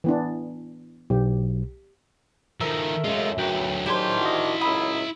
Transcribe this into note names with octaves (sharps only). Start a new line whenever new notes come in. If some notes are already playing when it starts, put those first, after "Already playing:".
E3 B3 D4
B1 G4
D#3 F3 A4 A#4 E5
F#2 G#3 A3 F4
D2 F#3 B4 G5
D#3 F3 D4 E4 G4 G#4 C5 C6
F#4 D#5
C#2 F#2 D#4 B5 D#6 E6